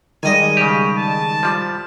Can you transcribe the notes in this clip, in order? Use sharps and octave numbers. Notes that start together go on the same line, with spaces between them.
D#3 G3 G#3 D#5 G#5
C#3 G4
A5
F3 G3